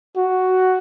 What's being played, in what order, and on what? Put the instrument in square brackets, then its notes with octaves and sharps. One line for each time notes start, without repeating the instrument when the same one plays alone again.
[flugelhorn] F#4